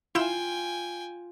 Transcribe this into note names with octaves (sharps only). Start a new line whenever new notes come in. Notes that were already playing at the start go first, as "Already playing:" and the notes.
E4 F4 G5 G#5 G6 E7